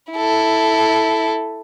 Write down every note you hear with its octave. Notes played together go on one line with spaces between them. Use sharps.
E4 A4